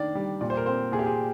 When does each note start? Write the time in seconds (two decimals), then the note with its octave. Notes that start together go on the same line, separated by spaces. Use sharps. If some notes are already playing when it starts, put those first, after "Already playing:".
Already playing: D#3 D4 D5
0.15 G3
0.41 A#2 D5
0.50 C5
0.57 A#4
0.66 C4 C5
0.92 A#2 G#4
0.99 G4
1.06 G#4